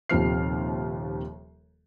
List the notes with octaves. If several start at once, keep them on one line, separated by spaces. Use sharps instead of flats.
D#1 D#2 C3 F3 F6 C7